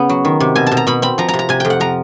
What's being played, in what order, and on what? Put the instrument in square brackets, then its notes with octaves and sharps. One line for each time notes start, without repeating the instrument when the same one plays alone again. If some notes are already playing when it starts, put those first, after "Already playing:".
Already playing: [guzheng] C#3 B3
F#3
D#3
C3
B2 G#5
B2 A5
A#5
B2 B5
C4 B5
F3 A#5
A#5
C3
A#5
C3 G#5
F2 G5
F#5
F3 A#5